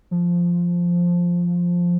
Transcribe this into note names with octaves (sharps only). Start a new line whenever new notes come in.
F3